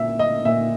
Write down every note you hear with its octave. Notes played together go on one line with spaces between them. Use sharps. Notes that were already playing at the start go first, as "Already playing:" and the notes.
Already playing: A#2 E5
D#5
A#2 E5